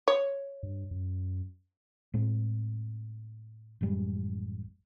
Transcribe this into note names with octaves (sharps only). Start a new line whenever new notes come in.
C#5
G2
F#2
A2 G#3 C4
A1 F#2 G3 G#3